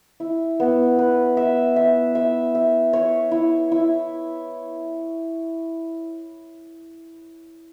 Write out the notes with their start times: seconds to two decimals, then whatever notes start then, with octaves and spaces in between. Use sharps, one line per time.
0.20 E4
0.60 B3
0.99 B4
1.37 E5
1.76 E5
2.15 E5
2.55 E5
2.93 C#5
3.31 E4
3.72 E4